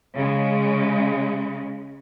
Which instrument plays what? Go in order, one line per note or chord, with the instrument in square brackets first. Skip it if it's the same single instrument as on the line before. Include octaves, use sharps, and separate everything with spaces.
[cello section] C#3 G#3